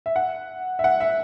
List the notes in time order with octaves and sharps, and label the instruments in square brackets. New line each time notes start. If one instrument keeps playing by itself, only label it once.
[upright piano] E5
F#5
E5
F#5
E5